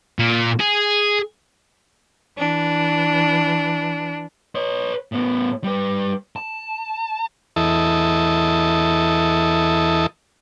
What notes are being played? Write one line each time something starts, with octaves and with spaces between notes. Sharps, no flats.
A#2
G#4
E3 D4
B4 C#5
A2 B3
G3 B4
A5
E2 E4 A4 D#5